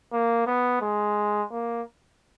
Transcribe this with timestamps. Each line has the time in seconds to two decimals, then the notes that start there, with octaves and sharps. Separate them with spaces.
0.13 A#3
0.47 B3
0.82 G#3
1.51 A#3